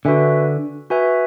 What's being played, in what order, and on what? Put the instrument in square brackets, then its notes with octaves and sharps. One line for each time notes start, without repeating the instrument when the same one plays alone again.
[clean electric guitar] D3 [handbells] F#4 B4 E5 G#5
[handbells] F#4 B4 E5 G#5